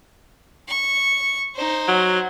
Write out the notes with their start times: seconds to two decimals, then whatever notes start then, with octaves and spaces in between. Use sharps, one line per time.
0.68 C#6
1.55 D#4 C5
1.88 F#3